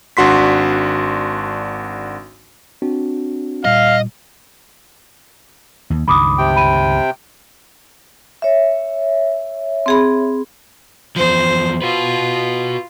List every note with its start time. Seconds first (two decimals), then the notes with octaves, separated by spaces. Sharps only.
0.17 G#1 D4 F#4 C6 B6
2.82 C4 D4 F#4
3.65 A#2 G3 D#5 F5
5.90 D#2
6.08 C#2 G2 D#3 B5 D6 D#6
6.38 C3 G5
6.56 B5 D#7
8.42 C#5 E5
9.86 C4 G#4 B5
11.16 E2 F3 C5
11.82 F4 F#4 B4